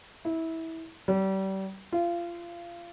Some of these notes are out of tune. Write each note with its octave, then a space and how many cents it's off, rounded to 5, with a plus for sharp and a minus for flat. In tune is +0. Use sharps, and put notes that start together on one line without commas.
E4 -20
G3 -30
F4 -25